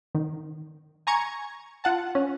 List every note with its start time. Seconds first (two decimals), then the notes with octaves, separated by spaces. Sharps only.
0.15 D#3
1.07 G#5 A#5 C#6 G#6
1.84 F4 F#5 A5
2.15 C#4